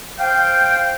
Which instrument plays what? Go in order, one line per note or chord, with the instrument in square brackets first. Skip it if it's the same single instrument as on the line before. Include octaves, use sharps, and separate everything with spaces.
[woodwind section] C5 F5 G5